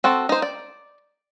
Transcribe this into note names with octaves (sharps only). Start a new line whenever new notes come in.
C4 F#4 A4
D#4 C5
D5